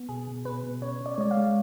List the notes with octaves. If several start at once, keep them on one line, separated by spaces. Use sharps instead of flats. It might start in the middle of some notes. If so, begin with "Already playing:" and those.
Already playing: B3
B2 G#4
B2
B2 B4
B2
C#3 C#5
C#3
D5
C#5
G#3 D5
F5
G#3